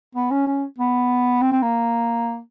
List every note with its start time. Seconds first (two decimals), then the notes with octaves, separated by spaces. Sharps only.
0.15 B3
0.31 C#4
0.47 C#4
0.79 B3
1.42 C4
1.52 C4
1.62 A#3